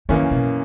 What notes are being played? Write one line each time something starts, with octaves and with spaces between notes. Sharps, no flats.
F#2 D#3 E3 A#3 C#4
B2